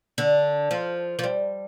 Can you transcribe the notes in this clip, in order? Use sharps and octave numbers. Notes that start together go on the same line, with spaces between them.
D3
F3
F3
G3